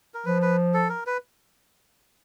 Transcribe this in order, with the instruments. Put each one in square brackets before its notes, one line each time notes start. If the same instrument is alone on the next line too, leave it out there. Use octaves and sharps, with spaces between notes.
[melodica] A#4
[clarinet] F3 [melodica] B4
[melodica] B4
A4
A#4
B4